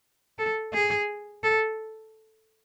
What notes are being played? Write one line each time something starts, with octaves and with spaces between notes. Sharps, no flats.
A4
G#4
A4